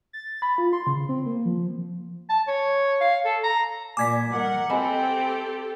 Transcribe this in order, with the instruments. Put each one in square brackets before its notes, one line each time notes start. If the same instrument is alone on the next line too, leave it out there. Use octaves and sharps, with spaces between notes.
[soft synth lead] A6
B5
F4
C6
C#3
C4
A#3
F3
[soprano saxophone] A5
C#5
F5
A4
A#5
[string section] A#2 [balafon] D5 G#5 [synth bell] D6 G#6 B6
[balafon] G3 [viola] A#4 [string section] F#5
[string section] C4 [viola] G4 A4 [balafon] D#5 G#5 B5